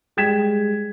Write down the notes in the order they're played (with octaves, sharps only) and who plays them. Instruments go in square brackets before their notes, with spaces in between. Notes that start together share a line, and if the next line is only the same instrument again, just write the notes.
[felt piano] G3 G#3 G5 G#6 B6 E7